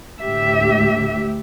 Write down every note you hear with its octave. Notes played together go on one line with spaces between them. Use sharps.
D2 A2 G4 E5